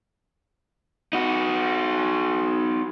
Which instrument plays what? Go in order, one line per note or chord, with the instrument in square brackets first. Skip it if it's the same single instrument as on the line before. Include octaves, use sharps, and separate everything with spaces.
[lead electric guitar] D#4 F#4